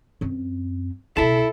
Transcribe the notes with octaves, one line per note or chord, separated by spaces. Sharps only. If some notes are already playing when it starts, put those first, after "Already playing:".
F#2 C4
C#2 B2 E4 A4 A5